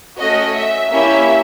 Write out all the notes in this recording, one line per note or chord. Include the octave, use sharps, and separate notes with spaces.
A3 C#4 F#4 D#5
E5
A#3 C#4 E4 G4 E5